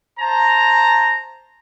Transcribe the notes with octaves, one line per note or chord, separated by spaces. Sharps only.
C5 A5 A#5